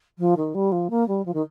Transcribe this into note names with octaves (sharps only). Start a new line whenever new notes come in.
F3
D#3
G3
F3
A#3
G3
F3
D#3